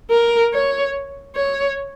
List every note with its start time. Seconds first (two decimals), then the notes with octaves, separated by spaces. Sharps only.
0.11 A#4
0.53 C#5
1.36 C#5